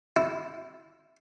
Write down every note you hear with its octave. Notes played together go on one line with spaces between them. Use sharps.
E4